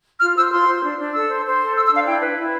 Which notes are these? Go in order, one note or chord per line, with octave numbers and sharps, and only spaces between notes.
F4 F6
C5 E6
F4 C6
C5
D4
D4
A4 E6
C5
C5
A4
C5 E6
E6
D4 F5
E4 G5
B4
E4